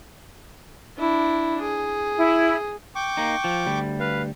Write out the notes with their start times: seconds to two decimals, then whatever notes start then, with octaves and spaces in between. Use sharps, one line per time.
0.98 D4 E4
1.62 G#4
2.17 E4
2.95 G5 C#6 D6
3.17 A#3 D#4
3.44 F3
3.66 D2 G3
4.00 B4 F5